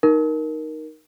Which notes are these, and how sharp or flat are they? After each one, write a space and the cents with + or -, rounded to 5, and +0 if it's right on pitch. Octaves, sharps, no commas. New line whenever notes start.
D#4 +0 A#4 +10